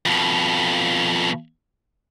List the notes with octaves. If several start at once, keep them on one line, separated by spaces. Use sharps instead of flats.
F2 B2